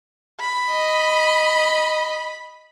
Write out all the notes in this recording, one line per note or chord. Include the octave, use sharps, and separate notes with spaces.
B5
D#5